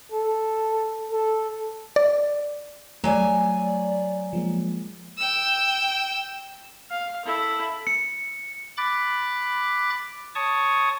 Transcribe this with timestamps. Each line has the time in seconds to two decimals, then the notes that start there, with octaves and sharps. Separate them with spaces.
0.12 A4
1.12 A4
1.96 D5
3.04 F#3 A3 D5 G#5
4.33 F3 G#3 A#3
5.18 G5 E6
6.91 F5
7.26 E4 A4
7.87 C#7
8.77 B5 D6 F#6 A6
10.35 C#5 A5 C#6 D#6